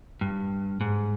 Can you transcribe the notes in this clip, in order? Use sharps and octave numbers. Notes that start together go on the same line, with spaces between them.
G2
G#2